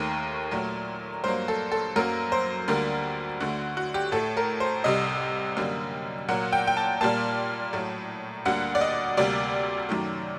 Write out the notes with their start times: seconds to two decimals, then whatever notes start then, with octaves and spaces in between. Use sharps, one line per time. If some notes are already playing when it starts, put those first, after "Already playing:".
Already playing: D#2 D#3 A3 A#4
0.51 A#2 F#3 A3
1.24 G2 F#3 A#3 C5
1.48 A4
1.72 A4
1.96 F#2 F#3 A#3 A#4
2.32 C5
2.68 D2 D3 G3 A#3 A#4
3.40 D2 D3 A3 F#4
3.77 F#4
3.94 G4
4.12 A2 A3 A4
4.37 A#4
4.60 C5
4.84 C2 C3 G3 D#5
5.57 F#2 D3 G3 A#3
6.29 A#2 F#3 A#3 F#5
6.52 G5
6.67 G5
6.77 A5
7.01 A#2 G3 A#3 A5
7.73 A2 F#3 A3
8.45 D2 D3 G3 A#3 F#5
8.75 D5
8.81 D#5
9.17 D2 C3 G3 A#3 D5
9.89 F#2 D#3 F#3 A3